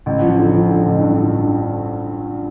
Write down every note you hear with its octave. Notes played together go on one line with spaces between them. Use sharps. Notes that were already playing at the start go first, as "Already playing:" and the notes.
A1
F3
D3
F3
D3
A1
G2
D3